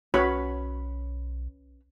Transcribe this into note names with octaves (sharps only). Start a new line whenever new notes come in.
B1 C#4 F#4 B4 C#5 B5